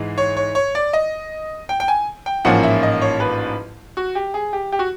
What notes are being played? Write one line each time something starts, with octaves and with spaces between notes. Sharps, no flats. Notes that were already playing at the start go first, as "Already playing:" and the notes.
Already playing: G#2 E3 G#3
C#5
C#5
C#5
D5
D#5
G5
G5
G#5
G5
A1 G#2 F3 A#3 C#4 F#5
E5
D#5
C#5
B4
F#4
G4
G#4
G4
G4
F#4